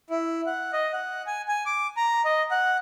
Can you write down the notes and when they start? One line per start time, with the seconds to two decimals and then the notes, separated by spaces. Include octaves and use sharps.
0.10 E4
0.46 F#5
0.73 D#5
0.93 F#5
1.27 G#5
1.48 G#5
1.66 D6
1.97 A#5
2.25 D#5
2.51 F#5